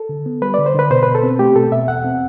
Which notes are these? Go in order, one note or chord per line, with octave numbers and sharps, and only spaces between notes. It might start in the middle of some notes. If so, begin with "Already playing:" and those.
Already playing: A4
D3
B3
G3 B4
D3 D5
C5
D3 B4
B2 C5
B2 B4
A4
C4
A3 G4
B2 A4
B2 E5
E2 F#5
C4